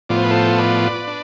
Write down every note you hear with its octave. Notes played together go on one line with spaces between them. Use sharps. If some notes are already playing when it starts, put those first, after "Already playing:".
A2 F3 B3 F4 D5
C5
B4
A4 C5
B4 D5
D4